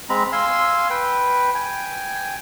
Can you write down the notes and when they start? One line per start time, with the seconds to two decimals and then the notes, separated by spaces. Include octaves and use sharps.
0.09 G#3 C4 A#5 B5
0.32 F5 G#5 C6 E6
0.90 B4 G5
1.55 G5 G#5